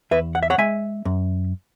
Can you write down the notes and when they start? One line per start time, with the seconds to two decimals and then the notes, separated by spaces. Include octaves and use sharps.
0.11 E2 B4 E5
0.35 F#5
0.43 E5
0.50 C#5 F#5
0.58 G#3 E5 G#5
1.05 F#2